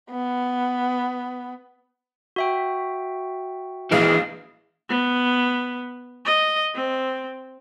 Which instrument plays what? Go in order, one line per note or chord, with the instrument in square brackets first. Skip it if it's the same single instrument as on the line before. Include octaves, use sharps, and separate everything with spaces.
[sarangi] B3
[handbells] F#4 E5 G5
[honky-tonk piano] A#1 F5 D7 [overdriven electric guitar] E3 G#3 [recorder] G#4
[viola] B3
D#5
C4